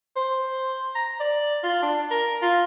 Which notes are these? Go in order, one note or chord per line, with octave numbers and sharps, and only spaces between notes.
C5
A#5
D5
F4
D4
A#4
F4